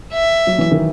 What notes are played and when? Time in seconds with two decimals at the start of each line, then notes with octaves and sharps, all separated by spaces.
0.13 E5
0.47 F#3
0.58 E3
0.71 D#3